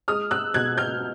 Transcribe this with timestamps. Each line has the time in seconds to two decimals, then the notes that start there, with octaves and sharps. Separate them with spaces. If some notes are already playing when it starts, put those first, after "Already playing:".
0.08 G#3 D#6 F6
0.31 E6 F#6
0.54 B2 F#6 G#6
0.78 F6 G6